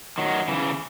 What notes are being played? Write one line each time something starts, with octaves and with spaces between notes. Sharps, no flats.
D#3 F#3
C#3 E3